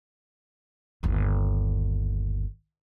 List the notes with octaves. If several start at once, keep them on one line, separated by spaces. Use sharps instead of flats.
G1 D#2